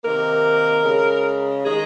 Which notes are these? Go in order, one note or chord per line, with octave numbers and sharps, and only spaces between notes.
C3 D#3 A#3 A#4
C#3 G#3
D#3 G#3 G#4